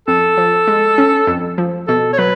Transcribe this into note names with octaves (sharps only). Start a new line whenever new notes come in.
F2 A4
F3
G#3
C#4
F2
F3
B2 A4
C#5
F#3 B4